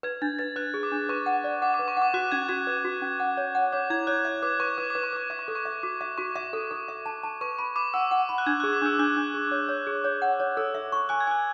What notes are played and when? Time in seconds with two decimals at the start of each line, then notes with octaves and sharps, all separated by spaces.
0.03 B4 G#6
0.22 D4 A6
0.39 B4 A6
0.56 B4 F#6
0.74 G#4
0.83 D6
0.92 D4
1.09 B4 C#6
1.26 F#5
1.44 D5
1.62 F#5 D6
1.74 D6
1.79 B4
1.88 C#6
1.97 F#5 D6
2.14 F#4 F#6
2.32 C#4 G#6
2.49 F#4 G#6
2.67 B4
2.85 F#4
3.02 C#4
3.20 F#5
3.37 C#5
3.55 F#5
3.73 C#5 D6
3.90 E4 G#6
4.07 C#5 F#6
4.25 E5
4.43 B4 D6
4.60 B4 C#6
4.78 B4 D6
4.90 B4 D6
5.03 C#6
5.13 B4 D6
5.30 E5 D6
5.39 C#6
5.48 A4
5.55 C#6
5.65 E5
5.83 F#4 D6
6.01 E5 D6
6.18 F#4 C#6
6.36 E5 D6
6.53 A4
6.71 A4
6.88 E5
7.06 A5
7.23 A5
7.41 B4 C#6
7.58 B5 C#6
7.76 B5 D6
7.94 F#5 E6
8.11 F#5
8.29 B5
8.38 F#6
8.46 D4 G#6
8.60 G#4 F#6
8.73 D6
8.82 D4 E6
8.99 D4 F#6
9.16 D4
9.34 G#4
9.51 C#5
9.69 C#5
9.87 G#4
10.04 C#5
10.22 F#5
10.40 C#5
10.57 A4 E6
10.75 E5
10.92 C#6
11.09 G#5 F#6
11.21 G#6
11.27 G#5 F#6